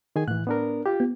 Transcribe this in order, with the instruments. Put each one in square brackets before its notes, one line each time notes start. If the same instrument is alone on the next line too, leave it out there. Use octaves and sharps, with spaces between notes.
[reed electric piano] D#3 G#4 G#5
[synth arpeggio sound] A2 [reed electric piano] E3 F#6
[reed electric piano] B3 D4 A#4
F4 G4
[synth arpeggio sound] B3